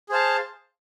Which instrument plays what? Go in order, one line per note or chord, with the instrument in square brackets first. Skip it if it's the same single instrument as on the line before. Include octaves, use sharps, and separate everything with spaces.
[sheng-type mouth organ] G#4 C5 F5 A5